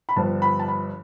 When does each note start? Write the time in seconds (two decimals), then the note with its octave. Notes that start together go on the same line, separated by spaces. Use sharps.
0.09 B5
0.16 G1 G2 F3 A5
0.42 B5
0.59 A5
0.68 B5